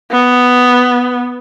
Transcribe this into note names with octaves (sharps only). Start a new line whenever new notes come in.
B3